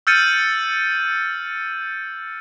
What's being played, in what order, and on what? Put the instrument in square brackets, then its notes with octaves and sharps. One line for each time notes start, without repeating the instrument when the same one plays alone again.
[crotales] E6 F6 G6 A6 C#7 D#7